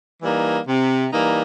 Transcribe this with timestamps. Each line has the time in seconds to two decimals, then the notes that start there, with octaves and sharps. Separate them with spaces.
0.23 E3 G3 A#3 D#4
0.68 C3
1.12 E3 G3 A#3 D#4